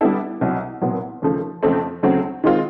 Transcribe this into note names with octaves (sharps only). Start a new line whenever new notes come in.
D3 G3 B3 E4 A4
C2 B2 F#3
C2 A#2 F#3 B3
D#2 C#3 F3 A3
F2 C#3 F3 A3 C4
D2 C#3 F#3 A3 C4
D#3 G#3 C4 F4